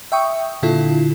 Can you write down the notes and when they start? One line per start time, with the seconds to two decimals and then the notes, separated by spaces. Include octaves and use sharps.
0.12 E5 G5 C#6 D#6
0.63 A#2 D3 E4 F4 A4